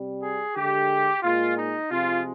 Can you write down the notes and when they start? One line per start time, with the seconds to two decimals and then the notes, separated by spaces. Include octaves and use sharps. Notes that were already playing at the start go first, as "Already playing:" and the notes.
Already playing: C3 G3
0.22 G#4
0.56 D3 G#3 G4
1.23 A#2 G#3 F4
1.57 D#4
1.91 C3 F3 G#3 F4